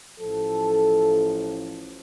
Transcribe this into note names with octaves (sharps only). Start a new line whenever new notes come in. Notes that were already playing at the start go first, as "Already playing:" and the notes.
A1 A2 F3 A4